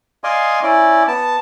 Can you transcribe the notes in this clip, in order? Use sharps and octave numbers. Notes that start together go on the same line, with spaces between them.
D5 D#5 F5 G#5 C6 D#6
C#4 E4 D5
B3 A5